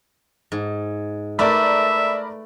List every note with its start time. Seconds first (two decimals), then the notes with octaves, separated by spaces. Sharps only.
0.52 G#2
1.39 A3 A#4 B4 D5 E5 B5